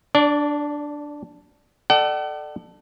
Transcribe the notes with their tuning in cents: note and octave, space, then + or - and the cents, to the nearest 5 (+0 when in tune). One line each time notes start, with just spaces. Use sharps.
D4 +0 D5 -30
A4 +0 D5 +35 F#5 +45